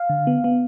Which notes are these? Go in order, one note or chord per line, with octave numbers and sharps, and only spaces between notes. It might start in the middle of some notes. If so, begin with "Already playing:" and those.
Already playing: F5
D3
B3
B3